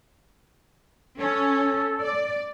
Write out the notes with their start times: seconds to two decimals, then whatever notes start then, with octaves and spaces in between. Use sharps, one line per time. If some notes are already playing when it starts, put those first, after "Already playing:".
1.19 C#4 A4
2.01 D5